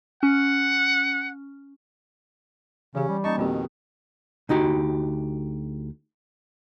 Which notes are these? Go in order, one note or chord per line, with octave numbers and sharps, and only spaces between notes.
C#4 F#5
C#3 E3 C#4 G4
G3
A#3 C#4 D#4 D#5 A5 C#6
F2 B2 D#3 A#3 C4 G4
D2 D#4 F#4 G4